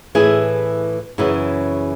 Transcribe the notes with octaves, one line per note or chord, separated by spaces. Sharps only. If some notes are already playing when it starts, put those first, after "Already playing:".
A2 E3 E4 G#4
F#2 C#3 E3 E4 G#4